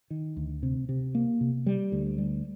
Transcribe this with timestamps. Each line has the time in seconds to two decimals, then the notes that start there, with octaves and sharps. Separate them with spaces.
0.10 D#3
0.37 D2
0.63 C3
0.89 C3
1.15 A#3
1.41 C3
1.66 G3
1.92 D2
2.18 G3